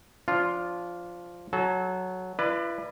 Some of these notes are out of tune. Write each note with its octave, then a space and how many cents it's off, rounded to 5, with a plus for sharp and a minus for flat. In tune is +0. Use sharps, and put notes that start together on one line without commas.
F3 +0 D4 -20 F4 +0
F#3 +0 A4 -35
E4 +45 B4 +0 D5 +35